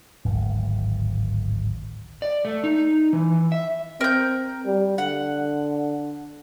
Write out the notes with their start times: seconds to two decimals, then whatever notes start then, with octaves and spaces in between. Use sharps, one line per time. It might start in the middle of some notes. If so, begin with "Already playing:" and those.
0.25 D1 G#1
2.22 D5
2.45 A3
2.64 D#4
3.13 E3
3.52 E5
4.01 C4 A#4 G6
4.66 G3
4.98 D3 F#5